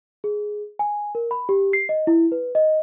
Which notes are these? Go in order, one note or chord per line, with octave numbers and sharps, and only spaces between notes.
G#4
G#5
A#4
B5
G4
C7
D#5
E4
B4
D#5